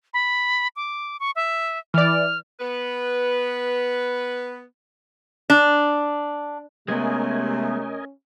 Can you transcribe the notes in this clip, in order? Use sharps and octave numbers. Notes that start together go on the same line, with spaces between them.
B5
D6
C#6
E5
E3 D5 F6
B3 B4
D4
C3 G#3 A3 B3 C#4 A#4 D#5 G#5